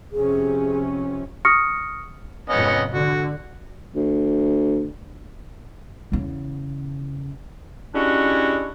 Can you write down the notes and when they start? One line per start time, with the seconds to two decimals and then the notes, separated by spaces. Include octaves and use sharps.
0.12 F2 C3 C#4 G#4
1.45 C#6 D#6 F6 A#6 C#7
2.50 F2 G#2 C3 B3 C#4 D#5
2.94 D3 F#4
3.95 D2
6.12 E2 C#3
7.94 G3 G#3 C#4 D4 E4 F#4